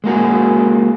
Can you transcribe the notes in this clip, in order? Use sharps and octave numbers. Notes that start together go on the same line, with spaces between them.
G#3 A#3 F#4 G#4